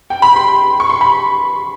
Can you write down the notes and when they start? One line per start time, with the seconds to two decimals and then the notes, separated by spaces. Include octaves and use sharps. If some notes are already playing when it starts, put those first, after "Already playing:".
0.10 G5
0.22 B5
0.36 C6
0.80 C#6
0.90 C6
1.01 B5